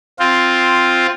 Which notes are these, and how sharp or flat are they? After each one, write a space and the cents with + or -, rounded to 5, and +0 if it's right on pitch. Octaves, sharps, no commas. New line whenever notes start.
C4 +0 F4 +0